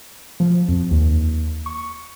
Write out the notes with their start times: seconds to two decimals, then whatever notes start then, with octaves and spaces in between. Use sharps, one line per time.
0.40 F3
0.68 F2
0.91 D#2
1.66 C#6